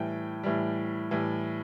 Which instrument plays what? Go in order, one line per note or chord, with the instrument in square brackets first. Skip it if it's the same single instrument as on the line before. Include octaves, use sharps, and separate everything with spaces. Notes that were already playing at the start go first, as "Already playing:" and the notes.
Already playing: [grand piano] A2 E3 G3 G5
A2 E3 G3
A2 E3 G3